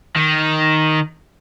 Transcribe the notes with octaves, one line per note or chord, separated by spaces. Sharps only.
D#3